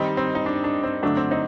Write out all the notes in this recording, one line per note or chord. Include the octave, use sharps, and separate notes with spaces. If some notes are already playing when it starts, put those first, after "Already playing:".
Already playing: D#3 G3 C4 D#4
C4
D#4
D4
D4
C4
D3 F#3 A3 D4
C4
C4 D#4